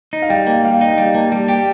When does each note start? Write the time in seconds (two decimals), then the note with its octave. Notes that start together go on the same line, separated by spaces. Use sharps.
0.13 D#4
0.22 F5
0.29 G3 G5
0.47 A#3 G5
0.64 G3 F5
0.81 D#4 G5
0.98 G3
1.15 A#3 A5
1.32 G3
1.48 G4 G5